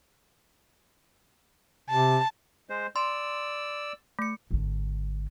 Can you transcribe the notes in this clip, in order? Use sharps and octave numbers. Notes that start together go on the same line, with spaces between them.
C3 A5
G#3 C5
D5 C6 E6
A3 C#7
G#1 D3